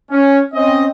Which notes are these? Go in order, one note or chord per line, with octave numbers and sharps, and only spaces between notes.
C#4
C4 C#4 D#5